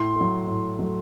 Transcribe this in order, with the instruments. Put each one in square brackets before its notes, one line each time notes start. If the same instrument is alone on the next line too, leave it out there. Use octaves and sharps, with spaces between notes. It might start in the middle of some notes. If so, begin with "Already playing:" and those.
Already playing: [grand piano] A2 [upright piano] C6
[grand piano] F#3 A3
A2
F#3 A3